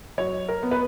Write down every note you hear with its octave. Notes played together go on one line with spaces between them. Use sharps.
F#3 C#5
A#4
B3
B4